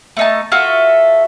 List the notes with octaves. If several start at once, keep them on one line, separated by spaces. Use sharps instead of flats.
A3 D#4 A5
F4 F#4 A4 E5